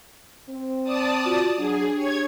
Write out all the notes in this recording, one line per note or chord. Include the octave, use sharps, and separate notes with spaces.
C4
D5 A5 D#6
F4 F#4
F#3 D4 G#4
G4 C#5 G#6